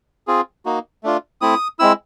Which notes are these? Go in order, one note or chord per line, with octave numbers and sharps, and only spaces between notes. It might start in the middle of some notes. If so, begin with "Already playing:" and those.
C4 F4 G#4
A#3 D#4 F#4
A3 D4 F4
A3 C4 E4 D#6
G#3 C4 E4 E6